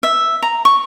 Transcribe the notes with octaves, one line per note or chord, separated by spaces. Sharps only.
E5
A#5
C#6